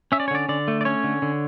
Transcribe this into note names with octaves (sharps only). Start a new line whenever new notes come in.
C#4 E5
D5
C#5
D3 D5
D3 D5
A3
D5
C#4 C#5
D3
D3